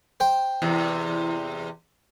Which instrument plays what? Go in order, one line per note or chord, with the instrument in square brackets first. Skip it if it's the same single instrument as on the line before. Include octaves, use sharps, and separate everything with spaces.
[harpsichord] C5 G5
[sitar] E2 C3